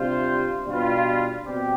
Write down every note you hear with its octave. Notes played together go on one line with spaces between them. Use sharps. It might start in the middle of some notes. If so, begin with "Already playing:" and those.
Already playing: C3 G3 D4 F4 C5
B2 G3 D4 F4 B4
B2 G3 C4 G4